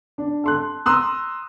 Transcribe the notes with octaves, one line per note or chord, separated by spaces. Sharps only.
D4
A4 C6 F#6
A#5 C6 D#6 E6 F#6